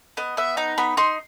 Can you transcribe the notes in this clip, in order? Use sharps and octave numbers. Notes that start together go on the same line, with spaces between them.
B3 D#5
B3 E5
D#4 A#5
B3 B5
D#4 C6